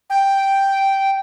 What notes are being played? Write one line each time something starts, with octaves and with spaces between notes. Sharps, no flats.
G5